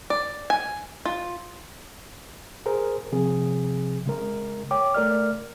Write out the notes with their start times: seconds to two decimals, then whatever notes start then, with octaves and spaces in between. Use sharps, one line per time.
0.10 D5
0.50 G#5
1.05 F4
2.66 G#4 A#4 C5
3.12 C3 F3 C4 G#4
4.06 C#3 G#3 A#4
4.71 C#5 G5 D6
4.94 A3 A#4 D5 F6